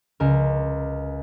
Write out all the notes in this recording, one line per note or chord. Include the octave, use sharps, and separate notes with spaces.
C#2 A#4